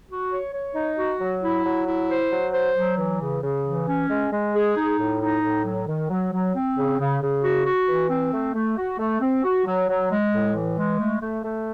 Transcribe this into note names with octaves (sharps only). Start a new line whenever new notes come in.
F#4
C#5
C#5
D#4
F#4
F#3
E4
F#3
E4
C5
F#3
C5
F#3
E3
C#3
C#3
E3
C#4
G#3
G#3
G#4
D#4
A2
D#4
A2
F#3
D#3
F#3
F#3
C4
C#3
C#3
C#3
F#4
F#4
E3
C4
A3
A3
F#4
A3
C4
F#4
F#3
F#3
G#3
A2
E3
G#3
A3
A3
A3